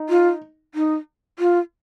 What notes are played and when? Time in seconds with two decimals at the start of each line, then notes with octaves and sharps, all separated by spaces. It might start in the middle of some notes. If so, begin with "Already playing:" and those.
Already playing: D#4
0.09 F4
0.75 D#4
1.39 F4